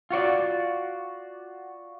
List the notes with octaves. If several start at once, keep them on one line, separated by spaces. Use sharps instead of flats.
F4 F#4 C#5 D5